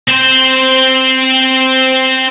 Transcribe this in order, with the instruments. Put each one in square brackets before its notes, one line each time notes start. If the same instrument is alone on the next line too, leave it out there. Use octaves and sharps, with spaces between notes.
[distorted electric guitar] C4 C5